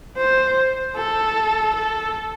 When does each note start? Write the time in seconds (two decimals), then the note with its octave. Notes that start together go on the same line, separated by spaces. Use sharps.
0.18 C5
0.96 A4
1.76 A4